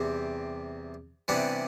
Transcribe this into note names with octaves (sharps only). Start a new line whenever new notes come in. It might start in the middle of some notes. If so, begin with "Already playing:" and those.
Already playing: E2 C3 G3 C4
C3 E3 G3 B3 D4